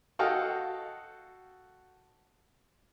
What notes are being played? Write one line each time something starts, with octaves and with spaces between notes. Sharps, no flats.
F#4 A4 D#5 F5 G5